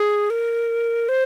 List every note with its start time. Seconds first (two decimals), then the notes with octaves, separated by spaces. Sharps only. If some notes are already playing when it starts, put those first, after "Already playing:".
Already playing: G#4
0.30 A#4
1.09 C5